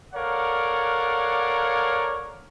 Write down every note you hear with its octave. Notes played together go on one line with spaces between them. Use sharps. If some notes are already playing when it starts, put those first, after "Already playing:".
A4 A#4 C#5 D5 F5 F#5